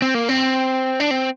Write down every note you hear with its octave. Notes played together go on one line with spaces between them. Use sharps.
C4
A#3
C4
D4
C4